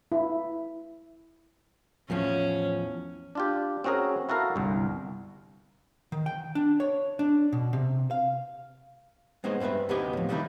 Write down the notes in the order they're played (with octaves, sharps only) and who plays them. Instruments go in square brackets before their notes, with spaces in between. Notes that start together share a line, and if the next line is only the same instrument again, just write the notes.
[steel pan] E4
[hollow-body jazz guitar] E2 A2 F3 [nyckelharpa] C#4
[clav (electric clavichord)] D4 F4 G4
C4 C#4 F#4 G#4 A#4
E4 F#4 A4 A#4 F5
G1 C2
[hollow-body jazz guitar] D#3
G5
D4
C#5
D4
B2
C3
F5
G#3 B3 C4 D#4 C5 C#5
G2 C4 E4 B4 E5
D2 C3 B3 D#4 G4 G#5
A2 F3
D3 D#3 G3 A3 D#4 E4